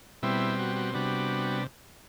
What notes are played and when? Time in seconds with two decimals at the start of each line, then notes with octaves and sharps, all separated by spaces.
0.23 B2 G3 C4 E4
0.59 F#4
0.76 F#4
0.94 C3 G3 B3 D4 F#4